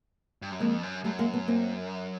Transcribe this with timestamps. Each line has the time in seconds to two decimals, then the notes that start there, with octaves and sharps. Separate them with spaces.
0.42 G2
0.52 F#2
0.60 F2 G#3 A#3
0.83 F#2
1.04 F#2 G3 A3
1.19 G#3 A#3
1.33 A3 B3
1.48 A#3 C4